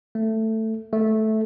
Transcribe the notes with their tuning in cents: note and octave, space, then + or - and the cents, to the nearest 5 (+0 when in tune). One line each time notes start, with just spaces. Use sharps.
A3 +10
A3 -10